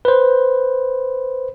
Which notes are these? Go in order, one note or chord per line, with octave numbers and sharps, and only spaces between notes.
B4 C5